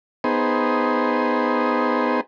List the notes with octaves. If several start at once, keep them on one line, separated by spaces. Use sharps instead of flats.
B3 D#4 G#4 C5